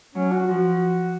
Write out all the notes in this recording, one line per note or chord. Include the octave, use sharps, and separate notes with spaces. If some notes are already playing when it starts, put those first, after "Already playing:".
F#3 C#4
F#4
F3 F#4